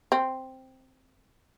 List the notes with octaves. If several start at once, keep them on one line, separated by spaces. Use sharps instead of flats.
C4